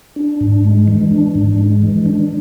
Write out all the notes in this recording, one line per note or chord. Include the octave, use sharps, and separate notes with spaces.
D4
G#2
G#3
E3
D4
G#2
G#3
E3
D4